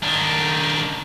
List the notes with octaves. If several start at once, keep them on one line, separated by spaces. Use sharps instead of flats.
D#3 D4